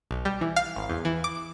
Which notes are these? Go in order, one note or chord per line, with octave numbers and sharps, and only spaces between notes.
B1
G3
E3
F5
G#1
E2
E3
D6